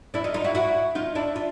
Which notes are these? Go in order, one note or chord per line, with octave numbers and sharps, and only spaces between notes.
D4 E4
D#4 F4
D#4 F4
E4 F#4
E4 F#4
D#4 F4
D4 E4
F4